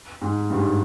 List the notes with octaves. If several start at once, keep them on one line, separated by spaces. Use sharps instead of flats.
G#2
G2
G#2